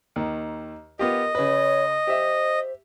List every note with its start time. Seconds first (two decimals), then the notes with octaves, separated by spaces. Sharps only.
0.16 D#2 D#3
0.99 B3 F4 G4 A#4 D#5
1.35 C#3 B4 C#5
2.07 G4 C5 E5